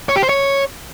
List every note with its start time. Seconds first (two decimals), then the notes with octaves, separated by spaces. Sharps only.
0.09 C#5
0.16 G4
0.23 C5
0.29 C#5